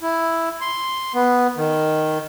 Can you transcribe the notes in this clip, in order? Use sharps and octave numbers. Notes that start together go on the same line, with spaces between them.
E4
C6
B3
D#3